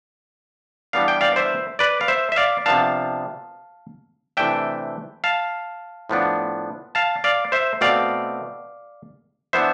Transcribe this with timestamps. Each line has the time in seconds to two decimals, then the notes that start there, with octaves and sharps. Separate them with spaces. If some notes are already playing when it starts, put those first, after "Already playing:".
0.93 E3 G3 B3 D4 F5
1.08 G5
1.21 D5 F5
1.36 C5 E5
1.79 B4 D5
2.01 F5
2.08 C5 E5
2.32 E5
2.36 D5 F5
2.66 C3 F3 B3 D4 F5 A5
4.37 C3 E3 A3 D4 E5 G5
5.24 F5 A5
6.09 A2 F3 B3 D4
6.95 F5 A5
7.24 D5 F5
7.52 C5 E5
7.81 B2 A3 C4 D5 F5
9.53 E3 B3 D4 C5 E5